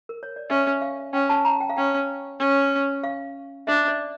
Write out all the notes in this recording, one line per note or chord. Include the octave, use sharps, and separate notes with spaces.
A#4
C#5
D5
C#4 E5
F5
C#4 G5
A5
A#5
G5
F5
C#4 G5
C#4
F5
D4 E5
D5